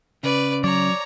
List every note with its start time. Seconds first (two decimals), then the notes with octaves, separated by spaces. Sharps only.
0.23 C#3 B4 D5
0.64 F#3 C#5 D5 A#5